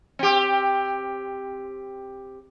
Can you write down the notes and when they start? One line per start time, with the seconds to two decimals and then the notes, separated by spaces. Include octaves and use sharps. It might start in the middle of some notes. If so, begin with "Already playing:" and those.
0.19 C4 G4